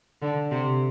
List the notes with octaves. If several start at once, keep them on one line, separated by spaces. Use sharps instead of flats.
D3
C3